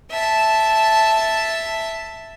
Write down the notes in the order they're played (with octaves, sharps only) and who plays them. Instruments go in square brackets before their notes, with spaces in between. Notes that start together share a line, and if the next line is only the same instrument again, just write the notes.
[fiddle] E5 A5